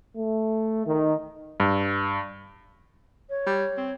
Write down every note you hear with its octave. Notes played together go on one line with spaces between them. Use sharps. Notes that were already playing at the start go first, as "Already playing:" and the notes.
A3
D#3
G2
C#5
G3
C4